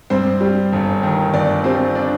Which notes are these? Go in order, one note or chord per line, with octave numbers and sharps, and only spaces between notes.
G2 C4 C5
G3
G1
D#3
G1 D4 D5
G3 C4 C5
D4 D5